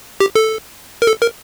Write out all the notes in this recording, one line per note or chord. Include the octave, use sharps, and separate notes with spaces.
G4
A4
A#4
A4
A#4